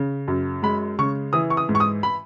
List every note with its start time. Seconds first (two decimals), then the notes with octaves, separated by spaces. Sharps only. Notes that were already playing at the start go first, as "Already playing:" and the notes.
Already playing: C#3
0.28 F#2
0.63 G#3 B5
0.99 C#3 C#6
1.33 E3 D#6
1.50 C#6
1.57 D#6
1.69 G#2
1.75 C#6
1.80 D#6
2.03 B5